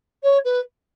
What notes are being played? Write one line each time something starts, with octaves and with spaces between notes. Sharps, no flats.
C#5
B4